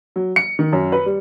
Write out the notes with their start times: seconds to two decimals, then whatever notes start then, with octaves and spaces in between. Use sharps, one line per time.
0.16 F#3
0.36 C#7
0.59 D#3
0.73 F#2
0.92 B4
1.06 G3